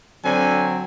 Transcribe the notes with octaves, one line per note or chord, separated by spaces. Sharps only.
D3 F#3 C4 G#5